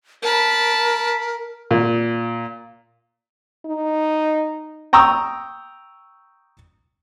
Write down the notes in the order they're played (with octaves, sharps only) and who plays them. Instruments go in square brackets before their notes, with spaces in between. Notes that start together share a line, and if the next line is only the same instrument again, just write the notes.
[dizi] A#4 [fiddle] A5 B5
[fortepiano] A#2
[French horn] D#4
[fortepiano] G5 A#5 C#6 D#6 E6